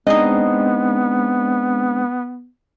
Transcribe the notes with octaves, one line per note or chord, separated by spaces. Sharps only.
G#3 B3 C4 D4 D#4 C5 D#5